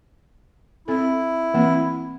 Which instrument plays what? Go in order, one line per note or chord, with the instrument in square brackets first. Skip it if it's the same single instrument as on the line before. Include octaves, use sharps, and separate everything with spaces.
[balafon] C4 A4 [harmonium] E4
[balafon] E3 A#3 C4